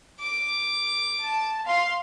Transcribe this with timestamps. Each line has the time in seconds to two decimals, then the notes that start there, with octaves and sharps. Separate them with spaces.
0.20 D6
1.24 A5
1.66 F5 C6